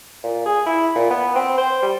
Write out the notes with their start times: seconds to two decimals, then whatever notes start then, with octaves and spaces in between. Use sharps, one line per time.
0.23 A#2
0.46 G#4
0.66 E4
0.95 A#2
1.10 B3
1.35 C4
1.57 C5
1.82 G3